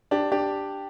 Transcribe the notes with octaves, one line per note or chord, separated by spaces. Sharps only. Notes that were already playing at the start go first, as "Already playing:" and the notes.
D4 G4
D4 G4